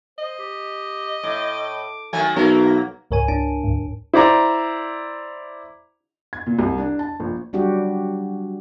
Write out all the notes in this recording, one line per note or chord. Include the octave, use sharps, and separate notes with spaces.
C5 D#5
G4
A2 D6
D#3 F#3 A3 G#5
B1 F#3 A#3 A#4 E5
C#2 G#2 A#4 C#5 G#5 D#7
G#1 D4 A5 D7
D2 G#2
E4 C5 D5 A#5 D6
G#6
A#2
C2
D4
A5
A#1
F#3 G3 D4 F#4 G4